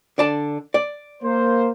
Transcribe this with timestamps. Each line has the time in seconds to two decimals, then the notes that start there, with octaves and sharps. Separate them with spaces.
0.18 D3 D5 A5
0.74 D5
1.22 A#3 C5